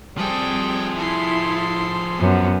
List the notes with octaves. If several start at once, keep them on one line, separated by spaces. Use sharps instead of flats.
F3 G3 C4 G#4 A4 G5
E4 A4 C6
F#2 B3